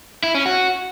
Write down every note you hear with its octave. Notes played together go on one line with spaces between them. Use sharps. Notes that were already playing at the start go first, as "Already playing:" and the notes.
E4
C#4
F#4